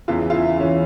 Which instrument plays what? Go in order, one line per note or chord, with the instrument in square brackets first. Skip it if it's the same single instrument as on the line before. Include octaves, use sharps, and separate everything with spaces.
[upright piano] E2 C#3 E3 F4
F4
E4
E2 C#3 E3 C#4